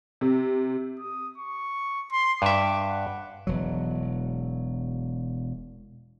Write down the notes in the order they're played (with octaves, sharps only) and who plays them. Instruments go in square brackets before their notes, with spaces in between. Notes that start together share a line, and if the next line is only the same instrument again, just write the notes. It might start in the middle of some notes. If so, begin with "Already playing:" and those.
[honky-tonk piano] C3
[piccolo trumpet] D#6
C#6
C6
[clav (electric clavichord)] G2 E5 [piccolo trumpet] D6
[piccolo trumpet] F#5
[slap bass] E1 F#3